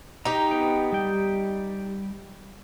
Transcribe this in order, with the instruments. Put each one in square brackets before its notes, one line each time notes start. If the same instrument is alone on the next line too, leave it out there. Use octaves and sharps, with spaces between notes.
[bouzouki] D#4 G4 [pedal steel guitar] A#5
[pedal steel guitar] B3 G5
G3 G5